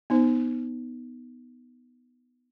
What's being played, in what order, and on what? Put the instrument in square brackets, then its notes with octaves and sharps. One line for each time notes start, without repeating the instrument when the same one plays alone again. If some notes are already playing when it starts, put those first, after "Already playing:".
[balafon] B3 D#4 C5